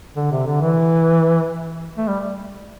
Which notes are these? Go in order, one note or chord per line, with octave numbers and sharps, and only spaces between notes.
D3
C3
D3
E3
A3
G3